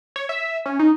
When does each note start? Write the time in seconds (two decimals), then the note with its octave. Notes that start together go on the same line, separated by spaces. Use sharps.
0.16 C#5
0.29 E5
0.66 C#4
0.79 D#4